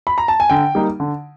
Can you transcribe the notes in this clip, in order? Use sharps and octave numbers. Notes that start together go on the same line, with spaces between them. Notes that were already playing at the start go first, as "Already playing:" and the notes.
B5
A#5
A5
G#5
D3 G5
G3 A#3 D#4
D3